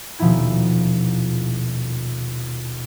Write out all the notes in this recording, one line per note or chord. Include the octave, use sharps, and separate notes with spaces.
D#1 B2 F3 D#4 E4 G#6